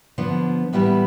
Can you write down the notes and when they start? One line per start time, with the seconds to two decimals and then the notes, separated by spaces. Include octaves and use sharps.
0.18 D3 F3 B3
0.73 A2 E3 G3 B3 E4